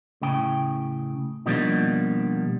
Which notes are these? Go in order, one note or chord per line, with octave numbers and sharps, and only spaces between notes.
A2 C#3 G5
B2 D#3 F3 G3 A#3 D4